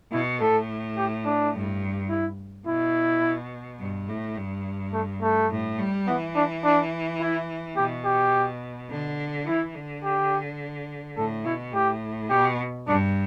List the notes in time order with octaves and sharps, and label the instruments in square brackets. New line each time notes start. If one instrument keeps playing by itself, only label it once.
[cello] B2 [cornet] E4
[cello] A2 [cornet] A4
[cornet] G4
D4
[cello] G2
[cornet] E4
[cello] B2 [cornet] E4
[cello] G2
A2
G2
[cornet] A3
A3
[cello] A2
G3
[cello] E3 [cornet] B3
[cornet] D4
D4
E4
[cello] B2 [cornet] G4
[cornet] G4
[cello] D3
[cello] E3 [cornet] E4
[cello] D3
[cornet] G4
[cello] A2 [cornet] A4
[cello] B2 [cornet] E4
[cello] A2 [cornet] G4
[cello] B2 [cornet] G4
[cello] G2 [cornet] D4